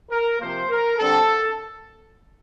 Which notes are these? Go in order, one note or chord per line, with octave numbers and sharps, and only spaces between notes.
A#4
C3 F3 A#3 C5
A#4
D3 G3 C4 A4